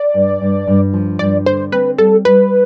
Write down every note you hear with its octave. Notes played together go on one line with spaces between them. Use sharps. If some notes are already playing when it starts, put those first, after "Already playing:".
Already playing: D5
G2
G2
G2
F3
G2 D5
D3 C5
C4 B4
G3 A4
G3 B4